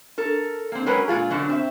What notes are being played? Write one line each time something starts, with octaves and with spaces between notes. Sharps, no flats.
A4 A#4
A#3 C4
F#3 G#3 C#4 A#4 B4
A#2 G#3 F4 G#4
F#2 B2 D3 F#3
C4 E5